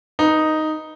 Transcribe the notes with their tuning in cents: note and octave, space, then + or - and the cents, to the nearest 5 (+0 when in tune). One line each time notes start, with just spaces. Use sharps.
D#4 +0 B4 +0